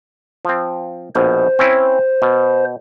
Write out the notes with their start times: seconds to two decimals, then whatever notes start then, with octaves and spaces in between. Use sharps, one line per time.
0.45 F3 C4
1.15 A#1 B2 C5
1.59 C4 C#4 E4
2.22 B2